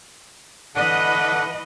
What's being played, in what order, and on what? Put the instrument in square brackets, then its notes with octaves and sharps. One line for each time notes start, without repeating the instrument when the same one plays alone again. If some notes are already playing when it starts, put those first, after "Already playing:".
[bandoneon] D3 D4 F#5 [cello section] E3 B4 D#5